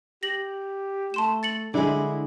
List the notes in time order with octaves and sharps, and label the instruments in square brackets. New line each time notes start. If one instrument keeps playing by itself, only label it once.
[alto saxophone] G4 [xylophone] A#6 F#7
[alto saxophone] A3 [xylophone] A5 C6 E7
[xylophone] A6 C#7 F#7
[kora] D3 G#3 [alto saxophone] E4